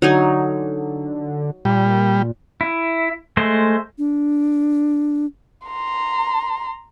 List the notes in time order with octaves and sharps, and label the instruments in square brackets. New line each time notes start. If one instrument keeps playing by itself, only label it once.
[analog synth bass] D3 [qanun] F#3 D#4 G#5
[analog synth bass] A#2 [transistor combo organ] G3
[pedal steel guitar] E4
G#3 A3 C5
[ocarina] D4
[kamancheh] A#5 C6